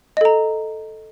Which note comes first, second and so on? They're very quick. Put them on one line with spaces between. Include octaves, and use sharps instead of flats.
D#5 A4 A#5